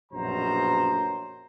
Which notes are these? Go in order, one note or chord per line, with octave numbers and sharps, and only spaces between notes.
A#1 F#2 B2 C5 A#5